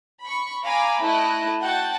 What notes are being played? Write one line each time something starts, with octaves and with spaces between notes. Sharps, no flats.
B5 C#6
F5 G#5 A#5 B5 D6
A3 E4 D#5 F#6
F#4 F#5 G5 A5 A6